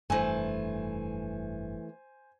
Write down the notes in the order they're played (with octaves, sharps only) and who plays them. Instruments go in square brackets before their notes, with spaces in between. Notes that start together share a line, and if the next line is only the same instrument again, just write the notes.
[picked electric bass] F1 G2 [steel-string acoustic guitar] E3 A3 [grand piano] C5 G#5